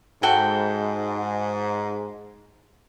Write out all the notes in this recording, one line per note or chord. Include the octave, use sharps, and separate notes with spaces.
G#2 F#4 A4 G5